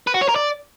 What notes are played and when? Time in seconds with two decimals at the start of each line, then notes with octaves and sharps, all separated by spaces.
0.07 B4
0.15 F#4
0.22 C#5
0.29 A#4
0.36 D5